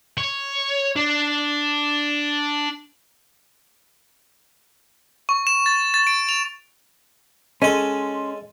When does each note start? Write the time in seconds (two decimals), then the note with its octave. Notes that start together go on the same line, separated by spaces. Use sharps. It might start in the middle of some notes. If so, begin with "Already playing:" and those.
0.18 C#5
0.96 D4
5.29 C#6
5.47 E7
5.66 A6
5.94 A6
6.07 D7
6.29 F7
7.62 G#3 C#4 A4 C6